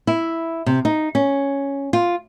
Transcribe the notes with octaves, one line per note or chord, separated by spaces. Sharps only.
E4
C3
D#4
C#4
F4